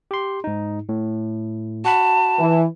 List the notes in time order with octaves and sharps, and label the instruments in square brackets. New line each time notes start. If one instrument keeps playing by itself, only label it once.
[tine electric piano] G4 C6
G#2 D#4
A2
[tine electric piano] F#4 F#5 B5 [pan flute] A5
[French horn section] E3